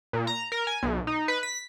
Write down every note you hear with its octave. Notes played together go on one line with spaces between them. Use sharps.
A#2
A#5
A#4
G#5
B1
D#4
B4
B6